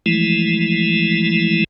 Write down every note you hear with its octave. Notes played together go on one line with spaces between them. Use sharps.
E3 F3 G#3 A3 E4